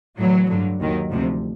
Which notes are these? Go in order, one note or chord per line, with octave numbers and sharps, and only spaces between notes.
A2 E3 F#3
G2 D3 F#3
D#2 D#3 F#3
D2 C3 F3